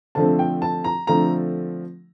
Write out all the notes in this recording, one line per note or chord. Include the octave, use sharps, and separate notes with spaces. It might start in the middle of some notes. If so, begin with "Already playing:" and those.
D3 F3 A3 C4 A5
G5
A5
A#5
D3 F3 A3 C4 A#5